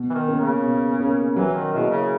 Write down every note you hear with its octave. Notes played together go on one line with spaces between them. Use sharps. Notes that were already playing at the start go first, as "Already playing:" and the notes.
Already playing: B2
E3
D#3
A#3 C#4
C#3
B2
A#3 C#4
E3 F#3
D#3
B2 A#3 E4 G#4
C#3